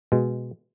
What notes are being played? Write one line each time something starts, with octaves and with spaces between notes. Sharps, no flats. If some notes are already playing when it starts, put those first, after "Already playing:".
B2 G#3